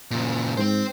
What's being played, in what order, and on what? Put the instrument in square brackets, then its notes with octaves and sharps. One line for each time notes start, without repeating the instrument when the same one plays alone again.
[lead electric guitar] A#2 C#3
[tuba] G#2 [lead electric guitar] C4 C5